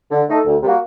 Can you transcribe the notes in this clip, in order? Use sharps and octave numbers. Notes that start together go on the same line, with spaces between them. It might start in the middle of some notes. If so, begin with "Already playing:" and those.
D3
A3 D#4 A4
D2
C3 G3 A#3 F#4